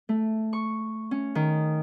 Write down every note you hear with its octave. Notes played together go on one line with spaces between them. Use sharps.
A3
C#6
C#4
D#3